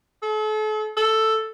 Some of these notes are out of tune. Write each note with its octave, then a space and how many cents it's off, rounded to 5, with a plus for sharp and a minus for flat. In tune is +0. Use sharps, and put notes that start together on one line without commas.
A4 -40
A4 +5